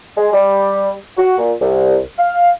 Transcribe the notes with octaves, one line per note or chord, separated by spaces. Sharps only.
G#3
G3
F#4
A#2
C2
F5